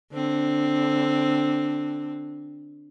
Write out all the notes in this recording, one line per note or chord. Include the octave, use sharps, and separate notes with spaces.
D3 C4